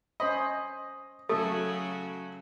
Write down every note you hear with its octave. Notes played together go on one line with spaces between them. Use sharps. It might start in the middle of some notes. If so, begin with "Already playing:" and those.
C#4 C5 D#5 B5
C#3 F#3 A3 F#4 A4